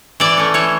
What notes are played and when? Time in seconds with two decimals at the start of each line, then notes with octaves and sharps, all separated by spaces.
0.20 E3 D5
0.37 A3 C#4
0.54 E3 C#5